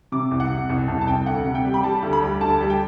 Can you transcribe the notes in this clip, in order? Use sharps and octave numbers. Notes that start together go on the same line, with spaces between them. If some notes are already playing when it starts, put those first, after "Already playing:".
C3 D6
C2
F#5
C3
C2
C2 A5
A5
C2 G5
D2 F#5
C3
G5
G3
B5
G3 A5
D2
B5
G3
D2 A5
G3
G5